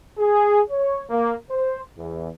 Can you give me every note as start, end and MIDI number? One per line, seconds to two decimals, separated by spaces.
0.18 0.61 68
0.70 1.03 73
1.09 1.34 58
1.51 1.83 72
1.98 2.30 40